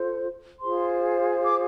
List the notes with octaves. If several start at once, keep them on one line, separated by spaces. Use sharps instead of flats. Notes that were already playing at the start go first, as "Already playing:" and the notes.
Already playing: F4 A4 C5
F4 G#4 C5 C6
D6